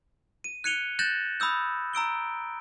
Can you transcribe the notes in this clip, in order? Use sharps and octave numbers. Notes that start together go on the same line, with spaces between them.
D#7
F#6 G#6 C#7 D#7 F7 G7
F#6 G6 A6 A#6 E7 F#7
B5 D#6 E6 G6
A#5 E6 D7 G7